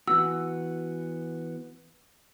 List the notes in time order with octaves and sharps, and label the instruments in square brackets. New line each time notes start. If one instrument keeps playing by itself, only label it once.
[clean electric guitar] E3 B3 F#4 [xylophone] E6